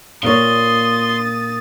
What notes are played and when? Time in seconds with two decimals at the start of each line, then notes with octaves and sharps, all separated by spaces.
0.23 A#2 F4 A#4 C#5 C6 D#6 A6